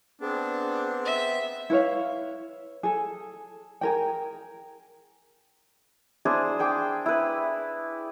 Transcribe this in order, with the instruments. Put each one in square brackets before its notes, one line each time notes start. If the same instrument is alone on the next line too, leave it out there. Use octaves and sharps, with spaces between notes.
[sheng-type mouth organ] B3 C4 [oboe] D4 [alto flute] G#4
[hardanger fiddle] E5
[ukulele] E4 B4 C#5 F5
G#4 A4
G#4 A#4 G5
[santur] D4 E4 G#4 C5
G#4 G5 D6
E4 B4